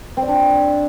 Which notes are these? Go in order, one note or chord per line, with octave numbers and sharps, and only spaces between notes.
C4
D5
D4